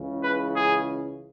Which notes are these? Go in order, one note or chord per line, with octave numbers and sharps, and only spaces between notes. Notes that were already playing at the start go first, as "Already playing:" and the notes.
Already playing: C#2 C#3 E3
B4
G#4